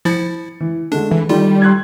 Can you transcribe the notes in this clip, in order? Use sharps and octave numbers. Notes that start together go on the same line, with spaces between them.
F3 E4 A6 C#7
E3
D3 G#3 A3 D4
E3
D#3 G3 A3 F4
C6 F#6 G#6